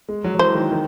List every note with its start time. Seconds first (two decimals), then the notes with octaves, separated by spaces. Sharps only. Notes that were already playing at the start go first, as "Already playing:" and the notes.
0.09 G#3
0.24 F#3
0.35 F#3
0.39 E3 C5
0.55 D#3
0.71 D#3